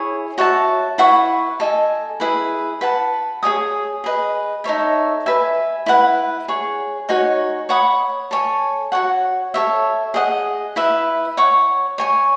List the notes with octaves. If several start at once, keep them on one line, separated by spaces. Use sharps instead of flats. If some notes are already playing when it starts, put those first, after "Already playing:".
Already playing: E4 G#4 C#5 G#5
F#4 C#5 E5 A5
E4 B4 F#5 C#6
A4 D#5 G#5
E4 G#4 B4
B4 F#5 A5
G#4 C#5 G#5 D#6
G#4 B4 D#5
D#4 A4 C#5 E5
B4 E5 G#5
E4 B4 F#5
G#4 C#5 F#5
D#4 F#4 C#5 G#5
C#5 F#5 B5 D#6
A4 C#5 G#5
F#4 A4 C#5 F#5
A4 C#5 E5
G#4 D#5 F#5
E4 B4 E5
C#5 F#5 C#6
C#5 G#5 C#6